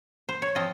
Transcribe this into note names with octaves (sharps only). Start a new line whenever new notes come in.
C5
C#5
F3 C4 F4 D#5